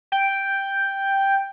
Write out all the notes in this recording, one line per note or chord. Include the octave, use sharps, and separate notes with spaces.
G5